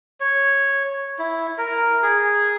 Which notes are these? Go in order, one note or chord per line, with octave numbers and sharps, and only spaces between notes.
C#5
E4
A#4
G#4